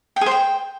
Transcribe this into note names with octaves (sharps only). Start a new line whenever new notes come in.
G5
G#4
C5
G5